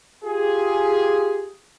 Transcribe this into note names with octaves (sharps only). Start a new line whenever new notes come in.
F4 G4 G#4